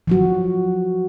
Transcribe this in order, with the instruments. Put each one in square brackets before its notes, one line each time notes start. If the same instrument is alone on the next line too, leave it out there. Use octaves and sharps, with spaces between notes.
[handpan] F3 F#3 F#4